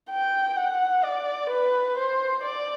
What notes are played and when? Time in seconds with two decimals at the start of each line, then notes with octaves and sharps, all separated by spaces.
0.10 G5
0.56 F#5
1.04 D5
1.49 B4
1.97 C5
2.43 D5